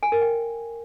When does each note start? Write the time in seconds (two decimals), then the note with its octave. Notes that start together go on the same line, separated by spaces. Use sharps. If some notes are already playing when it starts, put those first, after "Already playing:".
0.03 G#5
0.12 A#4
0.22 G5